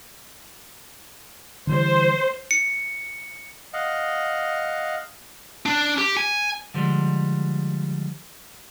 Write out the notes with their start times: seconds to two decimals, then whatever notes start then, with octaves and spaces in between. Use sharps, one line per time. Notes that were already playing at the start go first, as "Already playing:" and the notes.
1.67 D3 E3 G3 C5
2.51 C#7
3.73 D#5 F5 F#5
5.66 D4
5.98 G4
6.17 G#5
6.74 D3 F3 G3 G#3